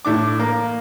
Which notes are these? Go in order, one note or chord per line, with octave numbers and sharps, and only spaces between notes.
A2 D4 D6
A#3